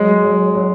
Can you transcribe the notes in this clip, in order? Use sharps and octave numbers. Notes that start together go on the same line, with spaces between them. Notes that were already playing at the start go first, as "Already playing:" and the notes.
Already playing: F#3 G#3
F#3
F#3